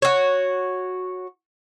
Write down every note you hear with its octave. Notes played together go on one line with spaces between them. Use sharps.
F#4 C#5